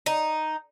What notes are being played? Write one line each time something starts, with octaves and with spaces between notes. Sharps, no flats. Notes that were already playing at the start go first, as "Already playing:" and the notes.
D#4